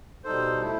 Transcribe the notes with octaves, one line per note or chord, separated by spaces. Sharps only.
B2 G3 D#4 A4 C5
A3 E4